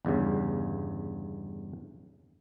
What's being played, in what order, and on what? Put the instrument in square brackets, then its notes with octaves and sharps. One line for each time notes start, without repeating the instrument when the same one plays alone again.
[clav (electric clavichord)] G1 E2 G2 C#3